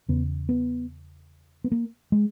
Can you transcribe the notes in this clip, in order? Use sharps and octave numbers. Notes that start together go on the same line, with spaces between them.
E2 C#3 B3
B3
B3
A#3
G#3